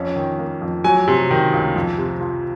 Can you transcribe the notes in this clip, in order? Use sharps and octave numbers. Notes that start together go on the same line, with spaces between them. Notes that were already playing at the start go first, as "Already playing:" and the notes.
Already playing: F2 C#4
D#3
A#3
F2
F#3 G#5
C3
D#3
C#2
F2
C3
F3